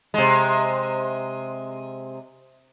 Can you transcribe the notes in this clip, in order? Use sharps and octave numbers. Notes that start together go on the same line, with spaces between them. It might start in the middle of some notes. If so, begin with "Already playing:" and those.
C3 G#3